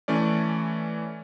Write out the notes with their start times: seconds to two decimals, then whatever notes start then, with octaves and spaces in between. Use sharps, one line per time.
0.08 E3 A3 C#4 D5